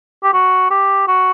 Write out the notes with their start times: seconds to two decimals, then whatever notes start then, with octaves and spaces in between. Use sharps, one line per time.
0.23 G4
0.33 F#4
0.70 G4
1.08 F#4